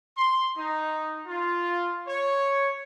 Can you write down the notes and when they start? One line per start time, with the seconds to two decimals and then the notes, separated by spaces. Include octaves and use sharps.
0.18 C6
0.57 D#4
1.27 F4
2.07 C#5